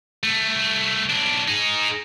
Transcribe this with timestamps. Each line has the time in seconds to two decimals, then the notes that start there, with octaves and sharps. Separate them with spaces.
0.23 C2 A3
1.10 B1 D4
1.48 D#4 G#4